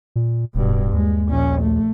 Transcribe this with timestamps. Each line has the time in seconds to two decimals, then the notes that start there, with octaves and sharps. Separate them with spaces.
0.16 A#2
0.55 D1 G2 B2
0.93 D#2 G#3
1.28 A#1 C#4
1.61 A3